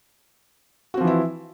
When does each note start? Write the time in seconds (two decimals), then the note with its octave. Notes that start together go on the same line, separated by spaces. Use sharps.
0.94 F#4
0.97 C4
1.01 F3
1.04 E3
1.07 E4